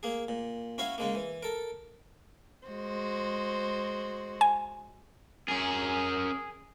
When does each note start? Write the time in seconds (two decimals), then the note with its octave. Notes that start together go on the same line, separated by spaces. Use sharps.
0.03 A#3 G#4
0.28 A#2
0.78 C#4 E4 F#4 F5
0.98 C#3 G#3 A#3
1.15 E3
1.43 A4 A#4
2.67 G#3 F#4 C5
4.41 G#5
5.48 C#4 G#4 A#4